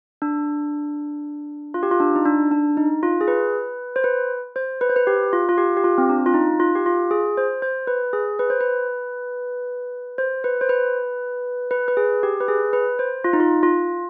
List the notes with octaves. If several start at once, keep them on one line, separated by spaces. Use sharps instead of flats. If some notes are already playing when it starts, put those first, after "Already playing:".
D4
F4
G4
F4
D4
D#4
D4
D4
D#4
F4
G#4
B4
C5
B4
C5
B4
C5
B4
G4
F4
F4
G4
G4
F4
C4
D4
F4
D#4
F4
G4
F4
G#4
C5
C5
B4
G#4
B4
C5
B4
C5
B4
C5
B4
B4
B4
G#4
G4
B4
G#4
B4
C5
F4
D#4
F4
F4